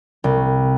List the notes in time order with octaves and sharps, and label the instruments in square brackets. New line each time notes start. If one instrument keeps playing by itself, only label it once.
[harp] C2